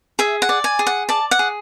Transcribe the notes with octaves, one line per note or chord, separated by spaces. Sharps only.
G#4 E5
F#5
D5
G#5
G#4
F#5
D5 A5
F#5
G#4